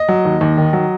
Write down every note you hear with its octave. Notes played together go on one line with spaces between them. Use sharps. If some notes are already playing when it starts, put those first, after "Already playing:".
Already playing: D#5
F#3
D#2
D#2
D#3
F#3